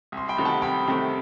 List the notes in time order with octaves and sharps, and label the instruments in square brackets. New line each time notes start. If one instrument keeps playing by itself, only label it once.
[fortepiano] C2
[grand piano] C6
G5 B5
[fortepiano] C3 D#3 A3
[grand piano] F#5 A5
[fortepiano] C2 [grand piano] G5 B5
[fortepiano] C3 D#3 A3